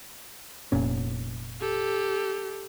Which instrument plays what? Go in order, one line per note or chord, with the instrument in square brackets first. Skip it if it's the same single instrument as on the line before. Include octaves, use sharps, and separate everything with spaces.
[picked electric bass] F1 A#2 C#4
[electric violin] G4 A4